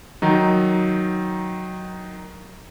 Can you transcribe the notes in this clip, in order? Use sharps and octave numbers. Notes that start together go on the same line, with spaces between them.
D#3 F#3 D#4